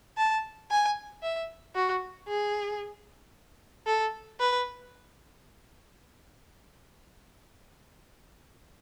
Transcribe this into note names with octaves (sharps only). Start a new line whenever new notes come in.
A5
G#5
E5
F#4
G#4
A4
B4